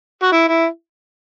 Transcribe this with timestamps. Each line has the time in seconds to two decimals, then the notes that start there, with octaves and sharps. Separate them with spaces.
0.23 F#4
0.32 E4
0.48 E4